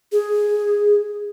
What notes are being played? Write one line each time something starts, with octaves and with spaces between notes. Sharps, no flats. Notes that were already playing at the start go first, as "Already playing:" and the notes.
G#4